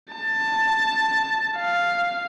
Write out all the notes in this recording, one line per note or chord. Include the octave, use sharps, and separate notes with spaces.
A5
F5